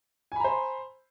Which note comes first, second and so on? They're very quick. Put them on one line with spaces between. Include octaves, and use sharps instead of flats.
G#5 B5 A#5 C5